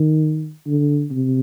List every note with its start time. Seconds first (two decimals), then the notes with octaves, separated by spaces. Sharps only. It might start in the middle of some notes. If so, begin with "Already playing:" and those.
Already playing: D#3
0.66 D3
1.11 C3